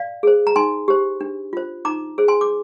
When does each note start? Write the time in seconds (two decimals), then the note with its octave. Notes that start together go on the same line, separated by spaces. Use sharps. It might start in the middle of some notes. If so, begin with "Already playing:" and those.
Already playing: D5 F5
0.23 G#4 C5
0.47 A#5
0.56 D#4 G#5 C6
0.88 G4 C5
1.21 D4
1.53 F4 C5
1.85 D#4 A#5 D6
2.18 G#4 C5
2.28 G#5 C6
2.41 D6